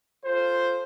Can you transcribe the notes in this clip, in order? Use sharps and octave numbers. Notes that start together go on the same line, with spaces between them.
F4 A4 C5